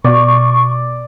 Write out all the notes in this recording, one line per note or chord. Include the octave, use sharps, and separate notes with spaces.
B2 D5 C#6